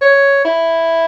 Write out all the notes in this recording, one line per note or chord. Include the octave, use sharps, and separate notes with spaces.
C#5
E4